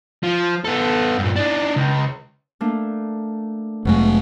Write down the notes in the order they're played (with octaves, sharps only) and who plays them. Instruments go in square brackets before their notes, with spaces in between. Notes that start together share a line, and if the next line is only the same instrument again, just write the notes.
[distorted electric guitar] F3
B3 A4
G2 A#2
D4 D#4
C#2
[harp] A3 A#3 D4
[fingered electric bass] F1 A3 [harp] B2 F#3 G#3